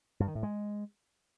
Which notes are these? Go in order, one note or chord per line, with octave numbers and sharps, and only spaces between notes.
G2
D#3
A2
G#3